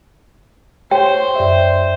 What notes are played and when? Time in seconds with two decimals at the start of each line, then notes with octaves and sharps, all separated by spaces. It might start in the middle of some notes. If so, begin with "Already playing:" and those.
0.91 G4 C5 C#5 G5
1.36 F#2 D5 E5